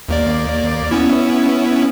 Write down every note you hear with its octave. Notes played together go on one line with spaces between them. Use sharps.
D#2 A#3 D5
B3 C#4 E4